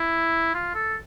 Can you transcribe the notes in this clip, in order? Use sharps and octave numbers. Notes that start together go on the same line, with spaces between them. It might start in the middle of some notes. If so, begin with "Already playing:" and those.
Already playing: E4
F4
A4